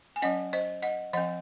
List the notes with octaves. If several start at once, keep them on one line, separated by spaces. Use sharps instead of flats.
G#5
F#3 C#4 D#5 F#5
C5 D#5
D#5 F#5
F3 C4 D#5 F#5